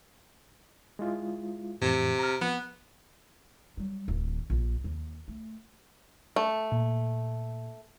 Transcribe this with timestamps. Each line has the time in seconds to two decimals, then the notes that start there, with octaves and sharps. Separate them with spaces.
0.99 G#3 E4 F4
1.82 F2 A2 C3 E3
2.19 A#5 F6
2.41 F3 B3
3.77 F#3 G3
4.08 D1 D#3
4.50 A#1
4.84 D#2
5.28 A3
6.36 A3
6.72 A#2